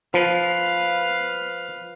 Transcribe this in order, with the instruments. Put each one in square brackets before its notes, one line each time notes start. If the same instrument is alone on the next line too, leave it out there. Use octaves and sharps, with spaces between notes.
[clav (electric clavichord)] F3 [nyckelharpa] B4 F5